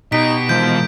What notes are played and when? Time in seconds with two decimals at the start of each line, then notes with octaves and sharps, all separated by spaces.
0.12 B2 D#4 G4 B6 D7
0.49 E3 F3 G#3 A#4 G6